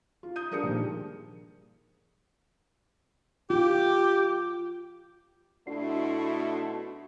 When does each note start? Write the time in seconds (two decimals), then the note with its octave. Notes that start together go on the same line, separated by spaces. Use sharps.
0.23 F4
0.36 D#6 G6 D#7
0.51 G3 D4 G#4 A#4 D#6 C#7
0.63 G2 A#2 D#3 F3 G3
3.50 F4 G4
5.67 B2 A3 D4 E4 F#4 C6